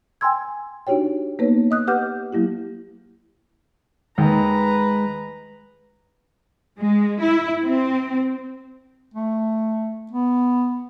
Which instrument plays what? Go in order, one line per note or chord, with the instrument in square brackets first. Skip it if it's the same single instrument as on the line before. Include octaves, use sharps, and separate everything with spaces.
[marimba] G5 G#5 A#5 C6 E6 G#6
D4 D#4 F#4 G4 C#5 G5
A#3 B3 D#4 B4 C#5
D#5 D#6 F#6
G4 B4 F#5 D6 F6 G6
F#3 A#3 E4 G4
[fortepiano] D#2 [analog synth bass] G#3 [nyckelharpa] B4 A#5
[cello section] G#3
E4
C4
[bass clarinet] A3
B3